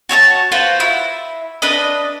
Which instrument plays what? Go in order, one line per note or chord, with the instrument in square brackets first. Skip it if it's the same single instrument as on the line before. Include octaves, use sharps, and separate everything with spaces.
[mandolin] F#4 C#5 E5 A5
F4 F#4 B4 C5
E4
D4 B4 D#5